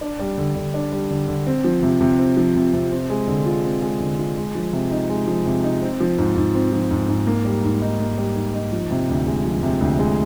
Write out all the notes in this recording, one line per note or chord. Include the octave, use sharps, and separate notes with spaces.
D4
G3
D3
D3
D4
G3
D3
D3
C4
F3
C3
C3
C4
F3
C3
C3
C4
G#3
D3
F4
C4
G#3
D3
F4
G#3
F3
C3
D#4
G#3
F3
C3
D#4
C4
F3
G#2
G#2
C4
F3
G#2
G#2
A#3
G3
G#2
D#4
A#3
G3
G#2
D#4
F3
C3
D2
G#3
F3
C3
D2
G#3